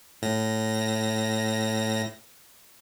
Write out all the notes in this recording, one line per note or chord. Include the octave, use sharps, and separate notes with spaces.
A2 A#6